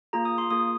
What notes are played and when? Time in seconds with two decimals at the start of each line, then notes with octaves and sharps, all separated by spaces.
0.13 A#3 F4 G#4 A#5
0.25 D#6
0.38 C6
0.51 A#3 F4 G#4 D#6